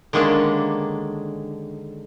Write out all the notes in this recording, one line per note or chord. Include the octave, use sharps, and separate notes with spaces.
D3 D#3 G#3 A#3 C#4 D4